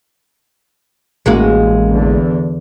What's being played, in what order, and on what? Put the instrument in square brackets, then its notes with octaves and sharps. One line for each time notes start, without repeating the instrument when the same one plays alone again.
[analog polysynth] A1 [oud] G#3 A#3 F#4
[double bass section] E2 D3